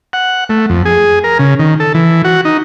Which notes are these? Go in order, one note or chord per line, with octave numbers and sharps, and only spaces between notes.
F#5
A3
F2
G#4
A#4
C#3
D#3
A4
E3
F#4
D#4